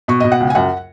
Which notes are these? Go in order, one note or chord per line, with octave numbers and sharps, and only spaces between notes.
B2 C#6
B2 D#5
F#5
C#2
G#5
F#2 F#5